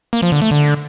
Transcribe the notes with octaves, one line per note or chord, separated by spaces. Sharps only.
A#3
F3
D3
A3
D3